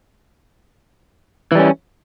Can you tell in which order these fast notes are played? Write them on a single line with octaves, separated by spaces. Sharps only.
E3 G3 C#4